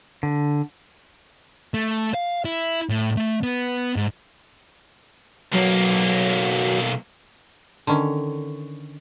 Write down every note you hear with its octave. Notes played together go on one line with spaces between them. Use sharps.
D3
A3
F5
E4
A2
A3
B3
G#2
B1 F#3 A#3
D3 D#3 C#4